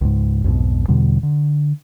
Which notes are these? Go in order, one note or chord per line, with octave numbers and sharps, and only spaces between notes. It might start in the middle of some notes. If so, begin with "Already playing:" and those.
C#2 G#2
B1 F2 G#2 B2
E2 B2 D3 G3
D3